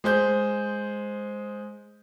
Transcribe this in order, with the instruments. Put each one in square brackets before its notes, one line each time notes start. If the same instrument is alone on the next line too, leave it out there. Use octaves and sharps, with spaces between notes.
[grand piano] G#3 C5 G6